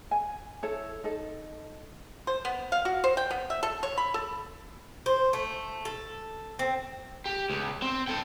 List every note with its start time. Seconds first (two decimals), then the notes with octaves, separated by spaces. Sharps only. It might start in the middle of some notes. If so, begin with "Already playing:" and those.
0.11 G#5
0.63 E4 A4 C#5
1.04 D#4 A4
2.27 C5
2.45 B3
2.72 F5
2.85 F#4
3.04 C5
3.17 G5
3.31 B3
3.50 E5
3.63 A4
3.83 C#5
3.98 B5
4.14 A4
5.06 C5
5.33 A3
5.85 A4
6.59 C4
7.26 G4
7.50 C#2
7.82 C4
8.08 A4 G5